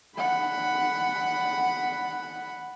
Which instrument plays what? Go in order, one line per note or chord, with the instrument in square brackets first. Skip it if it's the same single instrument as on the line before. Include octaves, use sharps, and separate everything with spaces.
[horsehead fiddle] F#5 B5